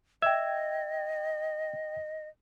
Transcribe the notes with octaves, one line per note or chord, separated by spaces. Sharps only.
D#5 E5 G5 G#6